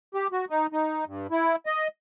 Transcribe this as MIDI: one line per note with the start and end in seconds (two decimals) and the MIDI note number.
0.14 0.27 67
0.32 0.45 66
0.50 0.67 63
0.73 1.05 63
1.06 1.27 43
1.31 1.56 64
1.66 1.88 75